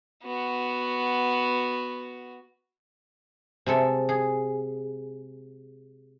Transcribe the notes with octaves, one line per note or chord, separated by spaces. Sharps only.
B3 F#4
C3 G#3 A4 E5
G#4